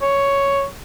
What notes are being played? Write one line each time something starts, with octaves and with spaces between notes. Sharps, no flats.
C#5